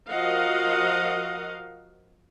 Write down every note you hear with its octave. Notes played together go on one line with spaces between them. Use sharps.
F3 F#4 A#4 D#5 F5 F#5